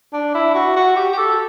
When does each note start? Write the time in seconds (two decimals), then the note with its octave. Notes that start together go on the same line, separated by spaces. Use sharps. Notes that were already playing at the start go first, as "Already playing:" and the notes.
0.13 D4
0.35 E4
0.54 F#4
0.76 F#4
0.96 G4
1.13 G4
1.18 A4